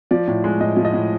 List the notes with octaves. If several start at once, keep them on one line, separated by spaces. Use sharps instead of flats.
F3 D5
A2
G#3
A2 D#5
F3
D#5
A2